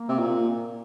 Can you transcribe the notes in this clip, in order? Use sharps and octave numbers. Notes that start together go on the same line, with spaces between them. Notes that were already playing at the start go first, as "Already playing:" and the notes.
Already playing: A#3
C3
A#2